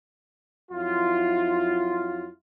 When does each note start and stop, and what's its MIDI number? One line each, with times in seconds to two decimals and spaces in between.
0.72 2.29 41
0.72 2.29 54
0.72 2.29 64
0.72 2.29 65